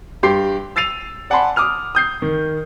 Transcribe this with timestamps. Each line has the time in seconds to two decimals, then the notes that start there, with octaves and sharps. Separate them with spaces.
0.23 G2 G4 C6 C7
0.76 E6 A6 C7 D#7 F7
1.30 D5 F#5 G#5 A5 B5 C6
1.56 D6 D#6 F6 F7
1.95 D#6 G6 C7
2.22 D#3